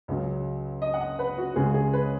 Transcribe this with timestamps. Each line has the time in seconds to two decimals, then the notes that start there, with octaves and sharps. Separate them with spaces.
0.08 C#2 C#3 F#3
0.82 D#5
0.94 F#5
1.01 D#5
1.19 B4
1.38 F#4
1.56 C#2 C#3 G#3 G#4
1.74 G#4
1.93 B4